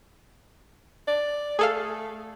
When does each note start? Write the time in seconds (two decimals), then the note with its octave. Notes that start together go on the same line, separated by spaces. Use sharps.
1.08 D5
1.59 A3 G#4 A4 F5